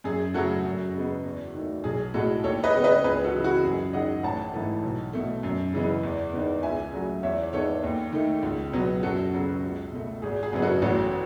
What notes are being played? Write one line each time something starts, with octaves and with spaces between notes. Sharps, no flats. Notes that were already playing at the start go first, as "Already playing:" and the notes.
F#2 G#4
C#3 F#3 A3 F#4 A4
F#2
C#3 G#3 B3
E2
D#3
A3
B1 G#4
A2 G#3 F#4 A4
D#2 A4 C#5
B4 D#5
C#3 G#3 B3
B4 D#5
C#2 G#4 B4
F#4 A4
C#3 E3
F#4
F#2 G#4
D#3 G#3 D#5 F#5
A1 F#5 A5
G#2 E3 A3
B1
B2 A3
F#2
C#3 E3 G#3 B3
E2
D#3 G#3 B3
C#2 E5 G#5
C#3 F#3 A3
E2 C#5 E5
D#3 G#3 B3 A4 C#5
D#2
D#3 A3
C#2
B2 F#3 B3
F#2 F#4 A4
C#3 F#3 B3
C#2
B2 A3
G#1 G#4
G#4
F#2 C#3 G#3 B3
F#4 A4
A1 F#4 A4